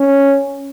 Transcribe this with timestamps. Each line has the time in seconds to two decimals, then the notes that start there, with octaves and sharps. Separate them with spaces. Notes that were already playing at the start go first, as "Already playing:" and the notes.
Already playing: C#4